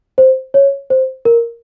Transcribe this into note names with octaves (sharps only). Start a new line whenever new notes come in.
C5
C#5
C5
A#4